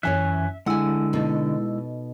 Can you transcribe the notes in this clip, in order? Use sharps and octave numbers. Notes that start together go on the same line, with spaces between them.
F#2 E3 C#4 C#5 E5 G#5 F#6
D3 G#3 E4 F#5 G#5 E6
B2 D#4 A4